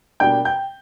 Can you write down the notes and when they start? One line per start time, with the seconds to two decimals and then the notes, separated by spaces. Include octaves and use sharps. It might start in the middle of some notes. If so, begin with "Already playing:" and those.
0.20 B2 G3 A#3 D4 G5 G6
0.45 G5 G6